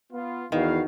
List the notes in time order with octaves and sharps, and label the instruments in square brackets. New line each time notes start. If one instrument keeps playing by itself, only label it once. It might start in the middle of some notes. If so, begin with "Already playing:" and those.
[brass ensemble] B3 F4
[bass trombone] E2 [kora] D#3 [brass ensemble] F#4 B4 F5